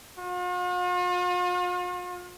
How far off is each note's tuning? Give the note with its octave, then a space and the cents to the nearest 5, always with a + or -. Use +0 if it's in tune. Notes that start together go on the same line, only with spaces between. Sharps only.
F4 +45